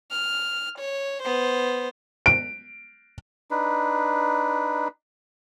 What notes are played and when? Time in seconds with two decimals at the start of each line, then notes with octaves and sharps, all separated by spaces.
0.11 F6
0.78 C#5
1.23 B3 C5
2.26 D7
3.51 D4 D#4 B4